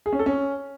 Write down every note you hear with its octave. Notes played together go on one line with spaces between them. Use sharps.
G#4
C#4
A4
C#4